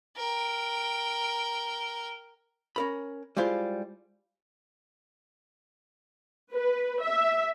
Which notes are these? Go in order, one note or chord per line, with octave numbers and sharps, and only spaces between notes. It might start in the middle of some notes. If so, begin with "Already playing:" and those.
A#4 G5
C#4 A#4 B5
G3 G#3 E4 F4 C5
B4
E5